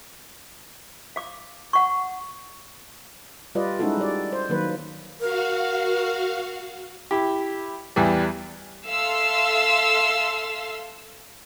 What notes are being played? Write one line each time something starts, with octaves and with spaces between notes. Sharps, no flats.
F5 D6
F#5 C#6
G3 F4 B4 D5 D#5
G#3 C#4 D#4 E4 F#4 A4
G3 D5
C5
D#3 F#3 A#3 B4
F#4 A#4 F5
E4 G4
E2 E3 G3
A4 E5 F5 C6 E6